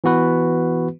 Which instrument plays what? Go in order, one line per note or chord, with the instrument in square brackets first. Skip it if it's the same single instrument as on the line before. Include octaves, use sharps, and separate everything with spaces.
[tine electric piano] E3 B3 F#4 B4